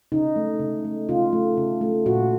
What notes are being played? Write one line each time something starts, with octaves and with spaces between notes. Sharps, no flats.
C#3 D#4
A3
C#3
A3
C#3 F4
A3
C#3
A3
A#2 F#4